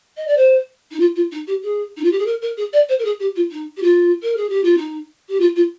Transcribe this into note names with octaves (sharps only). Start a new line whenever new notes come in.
D#5
D5
C5
D#4
F4
F4
D#4
G4
G#4
D#4
F4
G4
G#4
A#4
A#4
G#4
D5
C5
A#4
G#4
G4
F4
D#4
G4
F4
A#4
G#4
G4
F4
D#4
G4
F4
F4